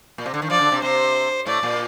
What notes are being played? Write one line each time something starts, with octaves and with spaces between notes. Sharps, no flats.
A#2
C3
D3
D#3
F3 D5
D3
C3
C3 C5
A2 D5
A#2